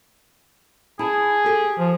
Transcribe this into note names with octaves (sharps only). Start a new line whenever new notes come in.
E4 G#4 A5
G4 A4
F3